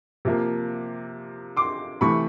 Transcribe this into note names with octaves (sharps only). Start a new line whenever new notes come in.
C3 F3 A#3
C6 D6
C3 E3 A3 B5 C#6